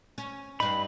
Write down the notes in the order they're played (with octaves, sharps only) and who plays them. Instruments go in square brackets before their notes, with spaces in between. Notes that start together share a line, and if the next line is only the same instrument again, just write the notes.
[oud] C#4
[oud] G2 D#4 [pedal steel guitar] B5